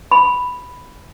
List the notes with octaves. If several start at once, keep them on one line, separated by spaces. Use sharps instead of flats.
B5